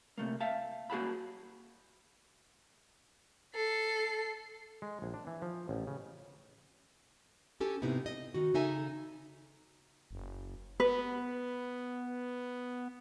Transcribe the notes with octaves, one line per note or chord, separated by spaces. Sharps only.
C3 A3 A#3
E5 F5 A5
A#3 F#4 G#4 F#5 A5 B5
A4 C7
G#3
A#1
D4
E3
F3
A1
C#3
C#4 G4 A4 G#5
G#2 C3 B3 D#4 E4
D#5
D#3 F#4
C#3 D#4 A4 E5 G#5
F#1
B3 B4